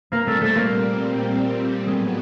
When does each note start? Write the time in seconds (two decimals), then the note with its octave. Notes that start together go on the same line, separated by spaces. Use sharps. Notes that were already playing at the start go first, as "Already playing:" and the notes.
0.11 A#2 G3 A#3 C4 A#4
0.27 A3 A4
0.41 A3 A4
0.55 A#3 A#4
1.87 A2 F#3 G#3 B3 G#4